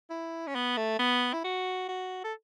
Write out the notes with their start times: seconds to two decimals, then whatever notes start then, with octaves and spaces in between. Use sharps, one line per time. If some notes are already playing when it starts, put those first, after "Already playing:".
0.10 E4
0.47 C#4
0.55 B3
0.77 A3
0.99 B3
1.33 E4
1.44 F#4
1.89 F#4
2.24 A4